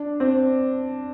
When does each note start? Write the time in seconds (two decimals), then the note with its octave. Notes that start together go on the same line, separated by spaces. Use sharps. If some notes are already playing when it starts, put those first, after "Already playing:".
Already playing: D4
0.20 C4